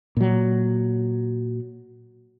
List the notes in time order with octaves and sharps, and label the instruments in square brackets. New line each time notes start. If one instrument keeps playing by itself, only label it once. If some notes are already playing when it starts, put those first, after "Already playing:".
[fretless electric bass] A#2 F#3